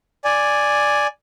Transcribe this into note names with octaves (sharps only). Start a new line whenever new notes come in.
D5 G#5